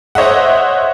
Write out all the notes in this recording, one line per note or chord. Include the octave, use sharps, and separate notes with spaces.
C5 C#5 D#5 E5 F#5